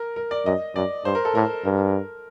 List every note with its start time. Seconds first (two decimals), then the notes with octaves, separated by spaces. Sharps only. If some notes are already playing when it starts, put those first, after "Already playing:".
Already playing: A#4
0.16 A#4
0.31 D5
0.45 F#2 D#5
0.75 F#2 D5
1.05 G2 C5
1.15 A#4
1.25 A4
1.35 A2 A#4
1.64 G2 A#4